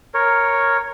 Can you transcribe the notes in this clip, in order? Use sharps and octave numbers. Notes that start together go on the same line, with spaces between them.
A#4 C#5